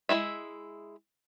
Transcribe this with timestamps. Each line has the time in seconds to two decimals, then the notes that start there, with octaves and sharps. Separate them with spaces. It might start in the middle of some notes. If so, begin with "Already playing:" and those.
0.09 G#3 D#4 E4 E5